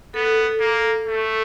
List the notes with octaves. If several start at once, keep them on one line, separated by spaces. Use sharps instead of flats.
B3 A4
A#3
A3